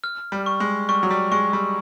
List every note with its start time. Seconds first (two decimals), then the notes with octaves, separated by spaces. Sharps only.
0.04 F6
0.32 G3
0.46 C#6
0.60 G#3
0.89 G3 C#6
1.03 F#3
1.11 G3
1.32 G#3 C#6
1.53 G3